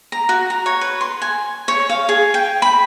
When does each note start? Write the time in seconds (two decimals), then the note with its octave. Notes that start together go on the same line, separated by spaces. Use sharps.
0.12 A#5
0.29 F#4
0.50 A#5
0.66 C#5
0.81 B4
1.01 C6
1.22 G#5
1.68 C#5
1.90 F5
2.09 G#4
2.34 G5
2.62 B5